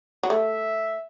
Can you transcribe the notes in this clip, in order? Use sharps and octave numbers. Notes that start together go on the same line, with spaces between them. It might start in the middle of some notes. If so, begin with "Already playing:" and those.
F#3
A3 E5